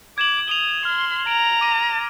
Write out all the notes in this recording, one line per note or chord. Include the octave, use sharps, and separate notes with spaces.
D6 G#6 E7 F#7
D#6 F7 G7
C6 F6
A#5 D7
D6 D#7